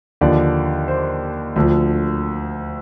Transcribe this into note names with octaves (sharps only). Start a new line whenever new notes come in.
D#2 D3 F3 D5
C5
D2 D3 F3